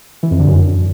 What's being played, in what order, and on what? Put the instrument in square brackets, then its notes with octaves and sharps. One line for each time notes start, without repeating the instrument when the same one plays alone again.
[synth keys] E3
F2
D3
F#2